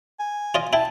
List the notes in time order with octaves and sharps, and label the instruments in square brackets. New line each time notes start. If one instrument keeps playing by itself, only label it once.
[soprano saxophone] G#5
[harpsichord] F4 D5 D#5
[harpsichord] E4 G5 [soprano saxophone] A5